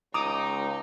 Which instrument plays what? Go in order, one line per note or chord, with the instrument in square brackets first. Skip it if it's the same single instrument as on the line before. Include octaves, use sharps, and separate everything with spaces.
[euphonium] C#2 [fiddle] D#4 [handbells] A#5 [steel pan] D6 D#6